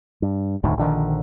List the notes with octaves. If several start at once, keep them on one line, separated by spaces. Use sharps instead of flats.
G2
E1 D2 A2 D#3
A#1 D3 D#3